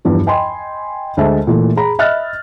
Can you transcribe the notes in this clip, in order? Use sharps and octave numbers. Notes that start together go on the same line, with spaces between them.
E2 G2 F3
D#5 G5 G#5 B5 C6
D2 G#3 C5 E5 A5
A#2 E3 A3
G#4 A#5 B5
D#5 E5 B5 F6 F#6 A6